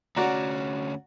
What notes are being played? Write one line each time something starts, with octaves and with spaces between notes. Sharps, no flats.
D2 C#4 F#4 D5 A#5